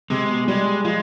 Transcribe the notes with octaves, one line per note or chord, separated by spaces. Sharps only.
C3 G#3
B2
G3 G#3
F3 G#3